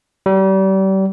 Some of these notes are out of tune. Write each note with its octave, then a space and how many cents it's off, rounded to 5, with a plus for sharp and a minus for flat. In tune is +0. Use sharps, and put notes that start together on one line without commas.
G3 -35